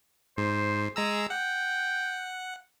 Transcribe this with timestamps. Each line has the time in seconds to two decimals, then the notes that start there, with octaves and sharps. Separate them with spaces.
0.38 G#2 C5
0.96 G#3 G#4 A#5 E6
1.30 F#5 G5